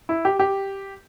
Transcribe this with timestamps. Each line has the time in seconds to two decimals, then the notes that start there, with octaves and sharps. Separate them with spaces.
0.09 E4
0.25 G4
0.40 G4